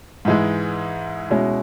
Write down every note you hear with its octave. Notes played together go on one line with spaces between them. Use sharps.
G#2 E3 G#3
B2 G#3 C#4 E4